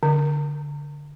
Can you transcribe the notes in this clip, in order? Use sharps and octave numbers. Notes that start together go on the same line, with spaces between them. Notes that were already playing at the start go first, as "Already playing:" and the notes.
D3